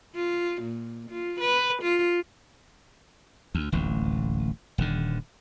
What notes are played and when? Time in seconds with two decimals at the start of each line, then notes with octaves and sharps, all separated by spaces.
0.15 F4
0.62 A#2
1.10 F4
1.40 B4
1.82 F4
3.55 D2
3.72 D1 A1 D#2
4.78 D#1 D#2 D3